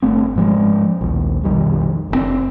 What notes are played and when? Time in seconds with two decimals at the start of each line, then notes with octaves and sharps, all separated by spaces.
0.02 G1 A3 C4
0.35 G#2 F3 G#3
1.01 A#1 D#2
1.44 B1 F2 D#3 G3
2.11 F#1 C3 C4